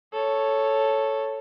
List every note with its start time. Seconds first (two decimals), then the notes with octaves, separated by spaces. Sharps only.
0.13 A4 C#5